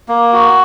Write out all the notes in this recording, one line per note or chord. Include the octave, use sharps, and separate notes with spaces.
A#3
F#4